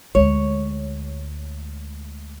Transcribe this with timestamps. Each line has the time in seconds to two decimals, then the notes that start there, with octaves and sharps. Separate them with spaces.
0.15 D2 G#3 C#5